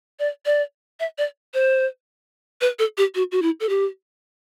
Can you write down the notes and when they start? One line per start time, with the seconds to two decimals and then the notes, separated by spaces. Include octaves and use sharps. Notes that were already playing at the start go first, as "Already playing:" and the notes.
0.19 D5
0.46 D5
1.00 E5
1.18 D5
1.54 C5
2.61 B4
2.79 A4
2.98 G4
3.15 F#4
3.32 F#4
3.42 E4
3.60 A4
3.69 G4